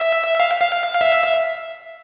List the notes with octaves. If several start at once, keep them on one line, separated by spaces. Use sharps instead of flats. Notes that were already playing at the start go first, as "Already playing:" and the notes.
Already playing: E5
F5
F5
E5